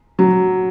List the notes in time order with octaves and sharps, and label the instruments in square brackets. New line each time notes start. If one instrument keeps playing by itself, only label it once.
[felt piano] F#3